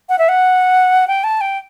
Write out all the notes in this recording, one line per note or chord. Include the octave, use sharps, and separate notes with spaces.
F#5
E5
F#5
G5
A5
G5